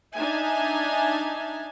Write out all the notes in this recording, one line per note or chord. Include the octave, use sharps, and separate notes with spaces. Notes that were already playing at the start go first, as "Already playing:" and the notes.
D4 D#4 E5 G#5 A5